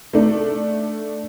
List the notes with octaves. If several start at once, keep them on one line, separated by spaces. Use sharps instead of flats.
A3 D4